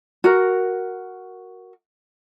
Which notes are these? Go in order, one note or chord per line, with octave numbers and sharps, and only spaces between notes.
F#4 A#4